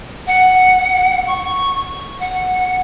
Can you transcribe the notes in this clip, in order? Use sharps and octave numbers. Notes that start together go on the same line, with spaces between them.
F#5
C#6
F#5